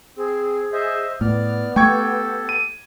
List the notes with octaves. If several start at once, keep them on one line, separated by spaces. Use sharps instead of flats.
C4 G#4
C5 D#5 E5
A2 B3 D5 F6
A3 G4 A4 G5 C#6 G#6
D#7